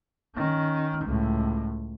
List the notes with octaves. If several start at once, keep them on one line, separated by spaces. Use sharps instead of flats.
D#3 C#4
C#2 A2